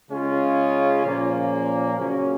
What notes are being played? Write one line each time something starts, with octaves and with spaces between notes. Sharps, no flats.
C#3 G#3 C#4 F4
A#2 F3 A#3 C#4
C#3 F#3 C#4